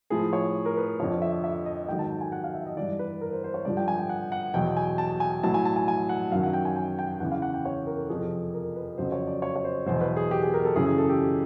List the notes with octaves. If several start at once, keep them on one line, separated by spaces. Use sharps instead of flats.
A2 F3 G#4
C#5
A#4
B4
F2 D3 F3 C#5
E5
E5
D#5
G#2 D#3 F#3 G5
A5
A5
G#5
F#5
F5
E5
D#5
G2 E3 D5
B4
A#4
C5
C5
C#5
G2 D3 F3 D5
G5
G#5
G5
F#5
F#5
E2 B2 F#3 G5
G#5
A5
G#5
A2 F#3 A5
G#5
A5
G#5
G#5
F#5
F#2 D#3 F#3 F5
F#5
G5
G#5
G#5
G5
E2 C#3 E3 F#5
F5
F#5
G5
C#5
A#4
A4
F2 C3 F3 G#4
A4
A#4
B4
F2 C#3 F#3 C5
C#5
D5
C#5
C#5
C5
E2 B2 F#3 C5
B4
G#4
G4
G#4
A#4
A4
F#2 C#3 E3 G#4
G#4
A4
G4